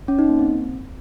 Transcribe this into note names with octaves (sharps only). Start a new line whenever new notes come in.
C#4
D#4
A#3
C4